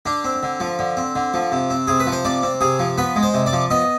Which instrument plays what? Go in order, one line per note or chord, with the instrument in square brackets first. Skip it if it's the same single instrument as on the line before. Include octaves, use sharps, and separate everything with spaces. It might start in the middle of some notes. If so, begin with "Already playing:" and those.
[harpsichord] D3 D4
C4
D3
F3
D3
C4
D3
F3
C3
C4
C3 G#4
B4
F3
C5
C3 D5
C4
C3 G#4
F3
B3 B4
G#3
C5
C3
D5
F3
B3 D#5